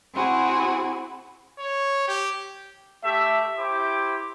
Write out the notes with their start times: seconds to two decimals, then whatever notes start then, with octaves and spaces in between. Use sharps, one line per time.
0.15 C4 E4 F#4 G#4
1.59 C#5
2.08 G4
3.04 A3 G4 E5
3.58 E4 G4 C5 D6